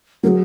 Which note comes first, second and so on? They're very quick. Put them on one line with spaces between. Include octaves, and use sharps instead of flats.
F#3 A#4 G#4